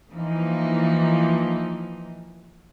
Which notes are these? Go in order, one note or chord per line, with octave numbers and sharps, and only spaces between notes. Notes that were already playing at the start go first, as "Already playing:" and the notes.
E3 F3 A#3 D#4